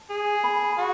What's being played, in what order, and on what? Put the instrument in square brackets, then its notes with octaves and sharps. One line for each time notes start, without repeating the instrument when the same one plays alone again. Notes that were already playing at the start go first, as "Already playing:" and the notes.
Already playing: [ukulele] A5
[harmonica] G#4
[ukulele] B5
A5
B5
[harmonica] F#4